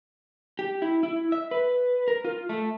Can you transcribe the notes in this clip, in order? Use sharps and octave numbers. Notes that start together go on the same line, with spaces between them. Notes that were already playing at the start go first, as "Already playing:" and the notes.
G4
E4
E4
E5
B4
A#4
F4
A3